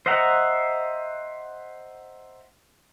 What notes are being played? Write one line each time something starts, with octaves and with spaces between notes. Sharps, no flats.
C5 D#5 E5 F#5 A#5